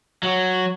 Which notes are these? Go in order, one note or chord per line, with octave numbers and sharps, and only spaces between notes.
F#3